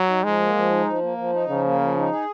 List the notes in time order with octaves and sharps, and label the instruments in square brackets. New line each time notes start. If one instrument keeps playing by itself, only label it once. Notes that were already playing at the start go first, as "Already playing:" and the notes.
Already playing: [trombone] F#3
[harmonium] D#4
[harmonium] F3 [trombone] G#3
[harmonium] A#3
F3
D#4
F3
A#3
F3
D#4
[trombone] C#3 [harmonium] F3
[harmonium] A#3
F3
D#4
G#4